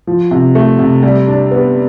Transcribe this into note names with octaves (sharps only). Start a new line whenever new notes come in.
F3
C3
A3
C3
G3
D4
B3